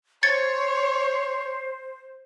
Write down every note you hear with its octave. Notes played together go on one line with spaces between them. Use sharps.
C5 C#5 G#6 A6 C#7